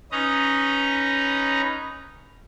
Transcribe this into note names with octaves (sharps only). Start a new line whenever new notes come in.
C#4 D#4 B4 D#5 A#5